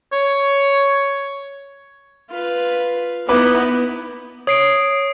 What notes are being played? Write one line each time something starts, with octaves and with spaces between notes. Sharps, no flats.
C#5
F4 B4
B3 D#4 E4 B4 D6
C#5 D#6 C7 D7